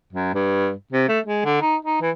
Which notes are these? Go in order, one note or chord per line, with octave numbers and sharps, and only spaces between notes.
F#2
G2
C3
A3
G#3
D3
D#4
D#4
E3